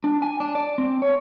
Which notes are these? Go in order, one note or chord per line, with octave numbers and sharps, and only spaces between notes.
D4
G#5
D4
D5
C4
C#5